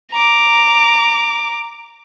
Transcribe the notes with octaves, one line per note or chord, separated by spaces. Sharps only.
A#5 D6